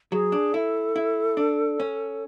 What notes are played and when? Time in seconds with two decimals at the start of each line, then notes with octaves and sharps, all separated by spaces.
0.12 F#3 G#4
0.32 D4
0.54 E4 A4
0.96 E4
1.37 D4
1.80 C#4